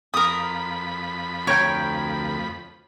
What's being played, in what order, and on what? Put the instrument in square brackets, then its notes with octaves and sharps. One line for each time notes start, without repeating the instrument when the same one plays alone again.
[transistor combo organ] F2 B5 [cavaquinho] A#4 D#6
[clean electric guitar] D2 A#4 G5 [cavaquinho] C#5